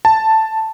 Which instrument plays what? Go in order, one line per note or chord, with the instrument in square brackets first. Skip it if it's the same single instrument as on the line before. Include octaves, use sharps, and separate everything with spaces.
[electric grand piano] A5